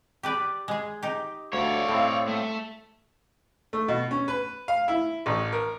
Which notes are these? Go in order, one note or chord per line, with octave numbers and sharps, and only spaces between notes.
G4 B4 D5
G#3 G#4
D#4 G4
D2 A4 C#5 D5 F5
A2 C4
A3
A3
B2
C#4
B4
F5
E4
A1
A#4